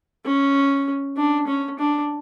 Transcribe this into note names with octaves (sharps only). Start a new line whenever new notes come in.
C#4
D4
C#4
D4